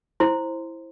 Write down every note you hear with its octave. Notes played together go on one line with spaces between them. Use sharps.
E4 C5 C6